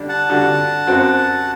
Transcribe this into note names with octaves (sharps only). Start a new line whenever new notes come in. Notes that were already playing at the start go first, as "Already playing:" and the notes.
Already playing: D3 G3 D4
F#5 A5
D3 G3 D4 F#4
F#2 F#3 C4 F#4